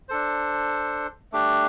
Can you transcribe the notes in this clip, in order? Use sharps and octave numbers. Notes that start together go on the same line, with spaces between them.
D4 A4 C5
A3 D4 G4